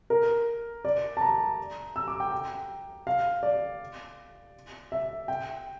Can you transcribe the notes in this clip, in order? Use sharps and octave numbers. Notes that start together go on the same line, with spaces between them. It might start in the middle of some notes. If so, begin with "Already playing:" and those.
A#4
D5
A5
A#5
E6
D6
G5
G5
F5
D5
E5
G5